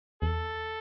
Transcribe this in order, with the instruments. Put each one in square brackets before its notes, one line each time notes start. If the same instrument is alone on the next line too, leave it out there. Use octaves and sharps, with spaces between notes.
[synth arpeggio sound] E2 [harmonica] A4